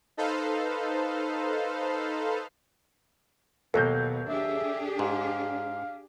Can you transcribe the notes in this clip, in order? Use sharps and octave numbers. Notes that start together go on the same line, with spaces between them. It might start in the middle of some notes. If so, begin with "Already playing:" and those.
D#4 A4 B4 C5 F5
D#2 B2 F#3 A#3 A4 G6
D4 G4 G#4 E5
G#2 F5